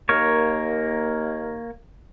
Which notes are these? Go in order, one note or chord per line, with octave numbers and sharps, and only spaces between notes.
D#2 A#3 A#4 C#5